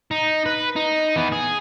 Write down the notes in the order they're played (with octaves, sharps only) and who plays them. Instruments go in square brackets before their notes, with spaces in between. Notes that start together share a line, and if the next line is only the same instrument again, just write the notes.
[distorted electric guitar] D#4
B4
D#4
E3 B3
G#4